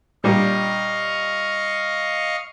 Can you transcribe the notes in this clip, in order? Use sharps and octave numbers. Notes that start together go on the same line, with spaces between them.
A#2 G3 D4 D#5 F5 C#6